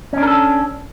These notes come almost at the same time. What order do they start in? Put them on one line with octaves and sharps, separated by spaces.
C#4 D4 A#4 A4